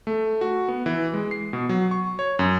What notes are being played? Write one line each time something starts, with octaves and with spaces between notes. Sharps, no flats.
A3
F#4
B3
E3
G#3
C7
B2
F#3
C#6
C#5
F#2